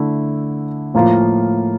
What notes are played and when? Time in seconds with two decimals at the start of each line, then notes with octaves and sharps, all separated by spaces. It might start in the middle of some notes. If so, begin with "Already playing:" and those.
Already playing: D3 A3 E4
0.94 A2 F3 A#3 F4 A#4